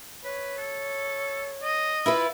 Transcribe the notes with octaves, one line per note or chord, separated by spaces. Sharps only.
B4 C#5
A4
D#5
E4 F4 B4 B5